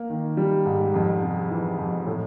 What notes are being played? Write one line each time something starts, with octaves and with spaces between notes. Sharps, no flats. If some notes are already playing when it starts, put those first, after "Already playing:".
Already playing: A#3
D#3
G3
G#2
F2
C3
E3
F2
A2